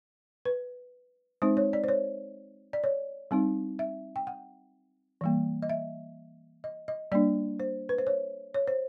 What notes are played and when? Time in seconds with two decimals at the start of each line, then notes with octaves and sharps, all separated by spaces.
0.45 B4
1.42 G#3 C4 D#4 C5
1.57 C#5
1.73 D5
1.84 C5
1.88 C#5
2.73 D5
2.84 C#5
3.31 G3 C4 D#4
3.79 E5
4.16 G5
4.27 F#5
5.21 E3 G3 A#3
5.62 D#5
5.69 E5
6.64 D#5
6.88 D#5
7.12 G3 A#3 D4 D5
7.60 C5
7.89 B4
7.98 C5
8.07 C#5
8.54 C#5
8.68 C5